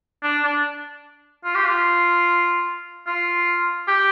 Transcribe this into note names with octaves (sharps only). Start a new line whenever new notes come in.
D4
D4
F4
G4
F4
F4
G4